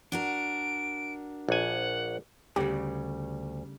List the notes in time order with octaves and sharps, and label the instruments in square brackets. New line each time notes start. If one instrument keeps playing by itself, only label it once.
[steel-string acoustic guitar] D4 F#4 A#4 [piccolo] D7
[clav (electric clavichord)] A#1 G#5 [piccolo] F#5
[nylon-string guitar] D2 [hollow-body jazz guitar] C#3 G3 [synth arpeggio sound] G4